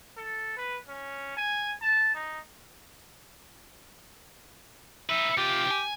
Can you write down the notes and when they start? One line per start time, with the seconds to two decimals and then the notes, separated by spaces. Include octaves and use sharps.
0.17 A4
0.56 B4
0.89 C#4
1.37 G#5
1.82 A5
2.15 D#4
5.09 D#4 B4 E5
5.37 C3 F4 G4
5.71 G#5